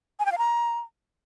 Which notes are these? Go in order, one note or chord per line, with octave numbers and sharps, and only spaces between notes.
G#5
G5
F5
A#5